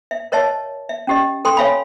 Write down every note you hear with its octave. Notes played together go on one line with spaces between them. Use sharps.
E5
A#4 C#5 D#5 E5 A5
E5
C#4 G4 D#5
A4 G5 C6
C#5 E5 F5 G#5 B5